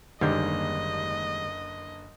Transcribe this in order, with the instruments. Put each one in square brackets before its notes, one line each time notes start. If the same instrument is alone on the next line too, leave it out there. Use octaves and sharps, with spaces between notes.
[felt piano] F#1 D3 G6 [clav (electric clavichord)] D#2 G#2 G3 [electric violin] D#5